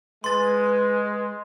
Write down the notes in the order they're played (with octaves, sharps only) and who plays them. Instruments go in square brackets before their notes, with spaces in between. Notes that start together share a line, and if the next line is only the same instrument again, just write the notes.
[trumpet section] G#3 [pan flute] B4 [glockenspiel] C6 A6